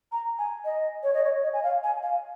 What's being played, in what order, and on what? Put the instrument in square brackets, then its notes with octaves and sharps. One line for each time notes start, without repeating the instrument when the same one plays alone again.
[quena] A#5
G#5
D#5
C#5
D#5
C#5
D#5
G#5
F5
G#5
F5